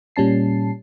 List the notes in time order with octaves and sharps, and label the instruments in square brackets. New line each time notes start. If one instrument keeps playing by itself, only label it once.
[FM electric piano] A#2 G3 C#4 A5 C7